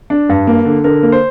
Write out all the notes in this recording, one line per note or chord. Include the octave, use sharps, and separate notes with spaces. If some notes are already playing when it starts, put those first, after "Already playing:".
D4
G2
A#3
D3
D3 A#4
A#3
C5